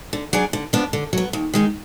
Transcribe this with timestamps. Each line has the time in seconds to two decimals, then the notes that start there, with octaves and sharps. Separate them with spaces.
0.13 D3
0.33 F#3 D4 G#4 D5
0.53 D3
0.73 F3 B3 D4
0.93 D3
1.13 F#3 B3
1.33 D#2
1.54 D#3 G#3 D#4